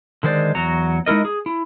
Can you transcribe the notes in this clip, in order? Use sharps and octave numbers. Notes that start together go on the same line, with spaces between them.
D3 D#3 G#3 C5 D5
E2 F#3 F#4 A#5
G#3 D#4 E4 A#4 D#5
G#4
E4